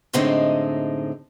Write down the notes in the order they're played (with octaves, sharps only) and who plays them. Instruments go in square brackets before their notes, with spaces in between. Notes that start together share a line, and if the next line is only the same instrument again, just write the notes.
[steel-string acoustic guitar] F#2 A2 D3 G#3 C4 D#4